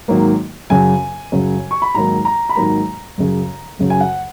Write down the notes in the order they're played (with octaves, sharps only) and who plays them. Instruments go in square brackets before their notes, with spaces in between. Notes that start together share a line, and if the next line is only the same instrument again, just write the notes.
[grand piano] G#2 D#3 F#3 A#3
F#2 C#3 F#3 G#5
F#2 C#3 F#3
C#6
B5
G#2 D#3 F#3 A#3 A#5
A#5
B5
G#2 D#3 F#3 A#3 A#5
F#2 C#3 F#3
F#2 C#3 F#3
G#5
F#5